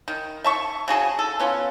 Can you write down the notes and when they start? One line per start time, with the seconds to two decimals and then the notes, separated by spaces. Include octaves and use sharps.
0.08 D#3
0.44 E5 A5 C#6
0.88 C#3 F#4 G#4 A5
1.19 A4
1.40 B3 C#4 F4